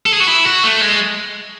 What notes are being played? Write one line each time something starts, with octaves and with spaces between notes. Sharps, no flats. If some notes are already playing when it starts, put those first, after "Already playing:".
A4
G#4
F#4
E4
F#4
A3
G#3